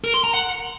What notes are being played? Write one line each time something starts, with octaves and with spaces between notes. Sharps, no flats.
A#4
C6
A#5
F#5